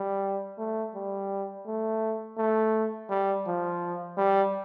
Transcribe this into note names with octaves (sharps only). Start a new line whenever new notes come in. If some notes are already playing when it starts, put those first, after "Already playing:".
Already playing: G3
A3
G3
A3
A3
G3
F3
G3